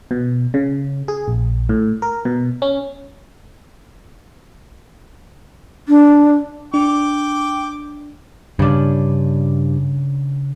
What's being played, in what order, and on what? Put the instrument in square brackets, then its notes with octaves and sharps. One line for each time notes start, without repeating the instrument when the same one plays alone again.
[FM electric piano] B2
C#3
G#4
A#1
A2
A#4
B2
C#4
[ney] D4
[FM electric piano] D4 [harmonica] G5 D6
[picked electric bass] G2 [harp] C#3 D4